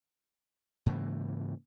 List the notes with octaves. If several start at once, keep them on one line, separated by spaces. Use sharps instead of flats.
G#2 C#3 E3 A#3